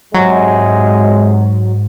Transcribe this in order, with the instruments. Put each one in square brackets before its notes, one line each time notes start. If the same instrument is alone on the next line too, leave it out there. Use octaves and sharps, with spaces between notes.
[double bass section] G#2 [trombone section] C3 G#3 [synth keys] F#3